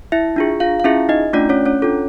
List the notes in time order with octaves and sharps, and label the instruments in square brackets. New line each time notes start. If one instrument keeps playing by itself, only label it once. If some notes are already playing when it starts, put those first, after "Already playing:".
[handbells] E4 E5
D4 F4 G#4
F4 F5
F5
C#4 E4 F4 G#4 E5
D#4 D#5
A3 C#4 D4 F4 D5
C#4 C#5
C#4 C#5
D4 F4 A4